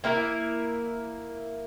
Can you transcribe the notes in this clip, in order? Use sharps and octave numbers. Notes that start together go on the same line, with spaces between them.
A#3 E4 A#4